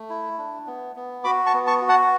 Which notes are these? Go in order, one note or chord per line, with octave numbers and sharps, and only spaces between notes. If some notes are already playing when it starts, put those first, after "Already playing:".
Already playing: A3
E4
D4
B3
B3
F#4 B5 D6
A5 C#6
B3
A5 C#6
F#4
F#5 A5